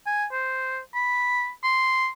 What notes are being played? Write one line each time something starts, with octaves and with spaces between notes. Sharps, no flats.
G#5
C5
B5
C6